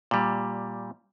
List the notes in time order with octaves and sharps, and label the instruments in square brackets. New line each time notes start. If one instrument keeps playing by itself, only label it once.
[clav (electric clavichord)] A#2 G3